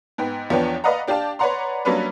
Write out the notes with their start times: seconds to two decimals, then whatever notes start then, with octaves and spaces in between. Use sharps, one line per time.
0.18 G#2 B3 G5
0.50 E2 F3 B3 D4 C#5 G5
0.84 B4 D5 D#5 F5 F#5 A#5
1.07 D4 G4 D5 F5 A5
1.39 B4 C#5 D5 F#5 A#5 C6
1.85 F#3 G3 A#3 C#4 D4 B4